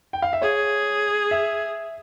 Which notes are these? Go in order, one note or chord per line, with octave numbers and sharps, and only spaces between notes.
G5
F5
E5
G#4 C#5
E5